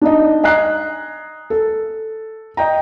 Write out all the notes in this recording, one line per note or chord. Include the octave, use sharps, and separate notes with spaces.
D4 D#4 D#5
D#5 G#5 A#5 F#6 C7
A4
D#5 G5 A#5